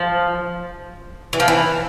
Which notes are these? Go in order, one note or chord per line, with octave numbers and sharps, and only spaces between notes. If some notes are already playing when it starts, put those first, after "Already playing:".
Already playing: F3
E3
F3
E3